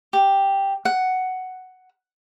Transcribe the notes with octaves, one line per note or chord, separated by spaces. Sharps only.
G4
F#5